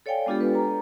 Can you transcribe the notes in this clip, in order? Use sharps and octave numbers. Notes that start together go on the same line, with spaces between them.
A4 C#5 D5 F5 G5 G#5
G#3 B3 D4 F4 G4 A4
B4
A#5